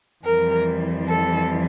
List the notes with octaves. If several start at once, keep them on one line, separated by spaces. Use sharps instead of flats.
F2 E3 G3 A#4
A4